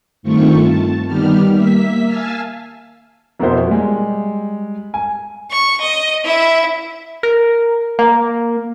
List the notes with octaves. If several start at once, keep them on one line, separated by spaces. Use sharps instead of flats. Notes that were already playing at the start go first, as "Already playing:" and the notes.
G2 D#3 A3 C4 F4 C#6
A5
D#3 G3 B3 G4 F6
A#3 E5 B6
F5 G#5 A5 E6 F6
F2 B2 E4 F#4 A#4 C5
G3 G#3
G#5
C#6
D#5
E4 E5
A#4
A#3